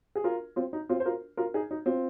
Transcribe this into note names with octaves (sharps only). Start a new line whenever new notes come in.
G#4
F4 A#4
C4 F4
D#4
C4 F4
C5
F4 A#4
F4 A#4
D#4 G#4
D#4
C4 F4